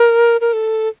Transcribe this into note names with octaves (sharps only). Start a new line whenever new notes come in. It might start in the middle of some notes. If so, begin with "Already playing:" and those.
Already playing: A#4
A#4
A4